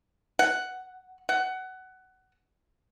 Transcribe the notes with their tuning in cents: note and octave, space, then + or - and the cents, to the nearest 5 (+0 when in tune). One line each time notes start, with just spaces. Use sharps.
F#5 +5
F#5 +20